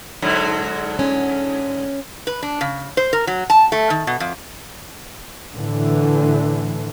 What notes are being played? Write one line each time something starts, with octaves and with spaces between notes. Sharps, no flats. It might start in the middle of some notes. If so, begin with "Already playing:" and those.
G#2 D3 F#3
C#4
B4
D4
C#3
C5
A#4
F#3
A5
A3
D#3
B2
F2
A2 D3 E3